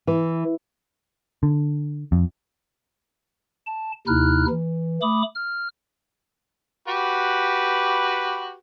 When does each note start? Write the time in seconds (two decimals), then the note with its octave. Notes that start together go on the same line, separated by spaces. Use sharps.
0.07 E3
1.43 D3
2.12 F2
3.67 A5
4.07 D#2 C3 D#4 E4 F6 F#6
4.49 E3
5.02 A3 B5 D6 D#6
5.35 F6
6.88 F#4 G4 B4